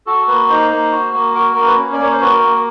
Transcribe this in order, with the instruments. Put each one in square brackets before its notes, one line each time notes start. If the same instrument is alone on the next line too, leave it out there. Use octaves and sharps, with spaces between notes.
[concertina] F#4 A4
A#3 B4
D#4 C5
A#3
F#4
A#3
F#4 A#4
A#3 A#4
B4
C#4
D5
A#3 C#5
C5
F#4 B4
A#4
A#3